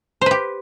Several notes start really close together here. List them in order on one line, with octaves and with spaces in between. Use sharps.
C5 B4 G4